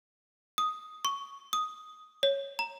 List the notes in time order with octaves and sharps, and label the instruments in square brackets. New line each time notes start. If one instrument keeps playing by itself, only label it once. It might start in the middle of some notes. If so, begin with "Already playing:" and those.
[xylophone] D#6
C#6
D#6
C#5
A#5